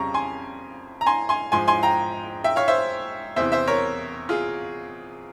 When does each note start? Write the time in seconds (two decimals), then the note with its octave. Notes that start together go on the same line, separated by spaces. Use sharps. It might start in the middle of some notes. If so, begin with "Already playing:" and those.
Already playing: F2 C#3 G3 A#5 C#6
0.14 G#5 C6
1.01 A#5
1.06 G#5 C6
1.29 G#5 C6
1.52 G#2 F3 G#5 C6
1.68 G#5 C6
1.83 G5 A#5
2.44 E5 G5
2.56 C#5 F5
2.68 C5 E5
3.36 E2 C3 E3 C5 E5
3.52 C5 E5
3.68 A#4 C#5
4.29 F4 G#4